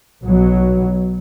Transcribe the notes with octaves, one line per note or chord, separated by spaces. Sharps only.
B1 B2 F#3